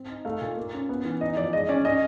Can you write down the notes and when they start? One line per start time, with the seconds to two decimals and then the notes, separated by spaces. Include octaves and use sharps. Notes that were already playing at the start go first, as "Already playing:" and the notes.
Already playing: C4
0.09 D#4
0.25 A3 F5
0.41 A#2
0.57 A#3
0.74 C#4
0.89 B3
1.05 E3
1.21 D#4 D#5
1.37 F3 D5
1.53 G#3 D#5
1.69 C#4 D5
1.85 C#4 D#5